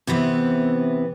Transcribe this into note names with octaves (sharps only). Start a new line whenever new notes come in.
C3 E3 B3 C4